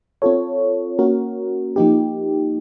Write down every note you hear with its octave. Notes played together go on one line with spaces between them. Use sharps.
C4 F4 A4 C#5
A#3 C#4 F#4 A#4
F3 A#3 D#4 G4